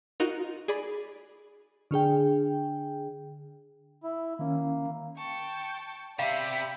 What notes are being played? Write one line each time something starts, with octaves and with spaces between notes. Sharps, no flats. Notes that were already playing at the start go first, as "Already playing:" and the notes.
D#4 F4 F#4 A#4
G#4 D5 B5
D3 D4 G#4 G5
E4
D#3 A#3 C#4
G5 A5 C#6
C3 G4 D5 E5 F5 B5